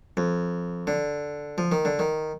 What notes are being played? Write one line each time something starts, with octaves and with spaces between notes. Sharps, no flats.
F2
D3
F3
D#3
D3
D#3